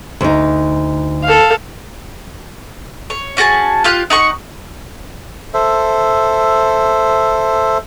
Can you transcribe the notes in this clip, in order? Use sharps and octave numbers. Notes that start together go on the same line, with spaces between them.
D2 D#4
A4 F5
C#5
C#4 F#4 G#4 A5
F4 G4 F5 F#6
D#4 F#5 C#6
A4 C5 E5